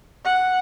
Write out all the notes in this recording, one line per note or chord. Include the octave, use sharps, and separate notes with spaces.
F#5